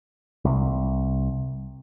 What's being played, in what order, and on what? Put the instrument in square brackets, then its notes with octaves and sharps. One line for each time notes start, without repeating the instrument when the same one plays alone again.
[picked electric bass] C2